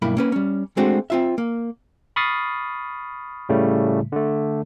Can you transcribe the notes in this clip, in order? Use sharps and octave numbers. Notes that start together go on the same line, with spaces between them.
B1 G2 A#3 E4 B5
A#3 C#4 B4
G3 C#4
G#3 A3 C4 D4 F#4
C4 F4 E5
A#3
B5 C#6 D#6 F6 A6 C7
A2 C#3 G3 A3
D3 A3